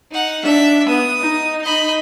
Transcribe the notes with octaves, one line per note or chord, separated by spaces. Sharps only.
D#4 F#5
D4 E5
B3 D#6
D#4
D#5 B5